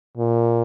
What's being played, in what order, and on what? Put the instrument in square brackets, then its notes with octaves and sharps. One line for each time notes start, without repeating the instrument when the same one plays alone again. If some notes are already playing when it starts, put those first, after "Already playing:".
[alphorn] A#2